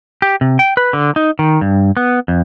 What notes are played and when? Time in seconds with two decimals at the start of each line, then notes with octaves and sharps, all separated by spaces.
0.22 G4
0.41 C3
0.59 G5
0.77 B4
0.93 D3
1.16 D#4
1.39 D#3
1.61 G2
1.97 B3
2.28 F2